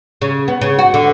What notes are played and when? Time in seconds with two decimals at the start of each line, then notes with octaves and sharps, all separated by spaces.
0.22 C#3
0.48 B3
0.61 C#3
0.79 F#4
0.94 D3